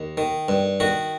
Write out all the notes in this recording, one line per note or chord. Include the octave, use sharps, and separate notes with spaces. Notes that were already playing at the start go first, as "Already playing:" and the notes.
Already playing: D#2
D#3
G2
D#3 F#4